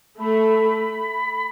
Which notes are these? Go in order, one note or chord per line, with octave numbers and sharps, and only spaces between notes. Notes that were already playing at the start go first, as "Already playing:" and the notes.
A3 B5